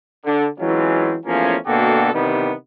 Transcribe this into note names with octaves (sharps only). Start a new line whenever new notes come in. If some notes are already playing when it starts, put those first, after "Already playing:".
D3
E3 F#3 G#3 C4 C#4 F4
E2 F3 A3 A#3 C#4
B2 D3 A#3 F#4 G4 A4
C3 D#3 E3 G3 B3